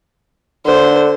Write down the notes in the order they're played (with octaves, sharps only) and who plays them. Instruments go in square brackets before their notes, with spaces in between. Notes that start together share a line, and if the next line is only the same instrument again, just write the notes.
[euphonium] D3 [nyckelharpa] C5